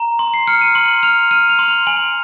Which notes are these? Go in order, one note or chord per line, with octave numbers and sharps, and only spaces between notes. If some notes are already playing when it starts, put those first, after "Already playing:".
Already playing: A#5
C6
C7
F6 C#7
D#7
C6 F#7
F6 F7
F6 D#7
F7
C6
F7
G#5 F#7